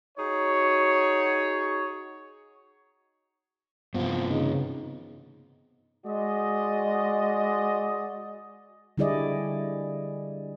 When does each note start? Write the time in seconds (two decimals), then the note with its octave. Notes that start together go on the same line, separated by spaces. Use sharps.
0.18 D#4 F#4 G#4 C#5
3.94 G2 C3 F3 B3
4.30 C#3 D#4
6.06 G#3 F#4 D5 D#5
8.98 D3 G3 E4 G#4 D5 D#5